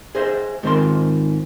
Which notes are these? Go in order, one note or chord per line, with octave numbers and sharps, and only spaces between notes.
G#4 C5 D#5 E5
G#2 D#3 C4 F4 A#4 C6